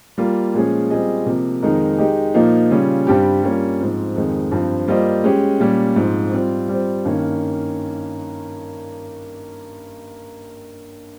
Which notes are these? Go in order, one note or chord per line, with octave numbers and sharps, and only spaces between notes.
G3 A#3 F4
A#2 F3 G#3 C#4 G#4
G3 C4 F4 G#4 D#5
C3 F3 A#3
F2 D#3 G#3 D#4 A#4
G#3 D#4 G4
A#2 F3 A#3 D#4
C#3 G3 C#4 F4
G2 G3 C4 G4
G3 A#3 C#4 F4
G#2 F3 C4
F2 D#3 G#3
G2 F3 C4
G3 A#3 F4 C5 D#5
G#3 C#4 G4
A#2 G3 C#4
G#2 F3 C4
G3 C4 F4
G3 C4 F4 C5
G2 D#3 A#3 C#4